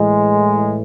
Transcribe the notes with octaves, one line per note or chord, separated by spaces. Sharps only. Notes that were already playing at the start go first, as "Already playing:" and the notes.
Already playing: A2 E3 G#3